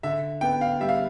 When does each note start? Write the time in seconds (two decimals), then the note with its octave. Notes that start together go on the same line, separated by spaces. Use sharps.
0.03 D3 E5
0.41 B3 G5
0.61 F5
0.80 G3 E5
0.89 F5